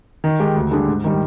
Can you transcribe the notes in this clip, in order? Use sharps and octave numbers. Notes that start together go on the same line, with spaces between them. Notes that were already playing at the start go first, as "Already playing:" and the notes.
D#3
G#3 D#4 G4
D2
D3 G3 D4 G#4
G#2
D#3 G3